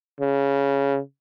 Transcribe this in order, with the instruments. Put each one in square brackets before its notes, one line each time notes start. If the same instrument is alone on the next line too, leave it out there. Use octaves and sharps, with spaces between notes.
[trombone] C#3